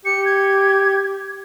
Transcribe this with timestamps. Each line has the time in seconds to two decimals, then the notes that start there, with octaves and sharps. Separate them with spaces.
0.05 G4 C#7
0.25 G#6